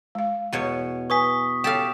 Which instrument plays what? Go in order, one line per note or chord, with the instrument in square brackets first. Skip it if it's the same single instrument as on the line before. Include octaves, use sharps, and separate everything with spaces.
[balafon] G#3 F5
[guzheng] E2 B2 C#5
[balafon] B4 G#5 [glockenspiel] C#6 D#6 B6
[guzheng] G4 A4 F5 [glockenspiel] E7